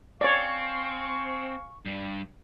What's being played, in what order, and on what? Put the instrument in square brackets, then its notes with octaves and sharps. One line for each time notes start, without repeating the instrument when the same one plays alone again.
[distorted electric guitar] C4 [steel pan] C#5 D5 [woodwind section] F5 G#5 C#6
[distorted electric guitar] G2 G3